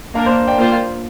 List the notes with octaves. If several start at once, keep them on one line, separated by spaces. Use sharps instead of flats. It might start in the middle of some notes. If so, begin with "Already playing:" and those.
A#3 D4 A#4 F5 A#5
C5
D5 G5
A#3 F4 C5